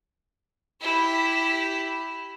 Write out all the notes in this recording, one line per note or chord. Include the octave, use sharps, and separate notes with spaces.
E4 G4